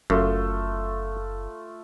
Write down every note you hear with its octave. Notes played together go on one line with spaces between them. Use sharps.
F#1 F#2 A3 F4